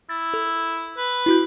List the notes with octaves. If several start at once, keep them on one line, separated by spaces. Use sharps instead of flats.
E4 A6
A4
B4
E4 F#4 G6